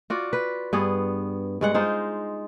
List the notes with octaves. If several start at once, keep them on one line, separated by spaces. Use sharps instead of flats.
F4 F#4 D5
B4
G2 B3 G#4
G2 G#3 F#5
G#3 D#4 F4 C5